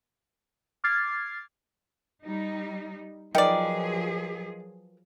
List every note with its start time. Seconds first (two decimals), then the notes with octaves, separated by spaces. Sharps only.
0.84 D6 F6 G#6 A6 C7
2.24 G3 D#4
3.35 F3 F#3 D#4 G#4 A#4 B4 D5 G5